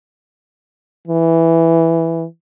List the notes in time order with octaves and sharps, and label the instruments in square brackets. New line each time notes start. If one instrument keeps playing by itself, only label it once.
[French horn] E3